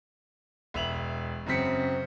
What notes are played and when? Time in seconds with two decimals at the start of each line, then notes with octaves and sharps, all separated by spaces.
0.74 E1 E5 F7 F#7
1.46 F#2 C#3 C4 B6 C#7